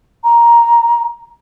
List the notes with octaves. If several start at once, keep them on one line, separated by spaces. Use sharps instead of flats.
A#5